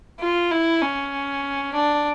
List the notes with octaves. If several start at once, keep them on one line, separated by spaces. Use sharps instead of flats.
F4
E4
C#4
D4